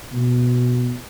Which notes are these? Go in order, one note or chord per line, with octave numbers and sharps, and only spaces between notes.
B2